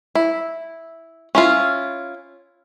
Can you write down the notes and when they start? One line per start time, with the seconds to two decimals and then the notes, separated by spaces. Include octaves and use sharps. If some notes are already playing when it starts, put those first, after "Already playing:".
0.15 E4
1.35 C#4 E4 F4